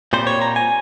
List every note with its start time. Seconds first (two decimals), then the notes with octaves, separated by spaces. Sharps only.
0.13 A#2 G3 C4 C5
0.27 C#5
0.42 A#5
0.56 G#5